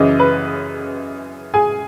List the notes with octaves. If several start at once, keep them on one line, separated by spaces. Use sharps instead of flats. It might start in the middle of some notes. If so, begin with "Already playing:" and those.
Already playing: F#2 C#3 E3 D#5
B4 B5
G#4 G#5